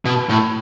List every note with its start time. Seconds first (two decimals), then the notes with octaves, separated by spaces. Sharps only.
0.05 B2
0.29 A2